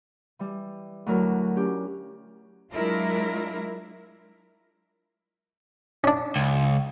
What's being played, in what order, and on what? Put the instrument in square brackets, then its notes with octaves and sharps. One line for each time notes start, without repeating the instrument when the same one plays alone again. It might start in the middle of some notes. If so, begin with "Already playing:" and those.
[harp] E3 G3
D2 F#3 E4 A#4
C#4 G4
[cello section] F#3 G#3 D4 E4 F4 A#4
[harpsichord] C#4 D4
[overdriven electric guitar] C#2